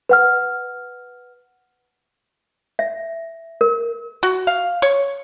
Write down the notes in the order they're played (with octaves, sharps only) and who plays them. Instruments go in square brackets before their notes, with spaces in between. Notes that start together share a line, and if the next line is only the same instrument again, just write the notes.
[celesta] B4 F#5 F6
[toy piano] E5
A#4
[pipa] F#4
F5
C#5